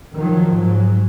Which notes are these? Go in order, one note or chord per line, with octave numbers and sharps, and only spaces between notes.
D#3 F3 F#3
G#2 F#3